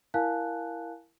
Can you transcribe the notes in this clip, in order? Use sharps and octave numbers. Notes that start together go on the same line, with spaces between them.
E4 A#4 F5 G#5 A5 F#6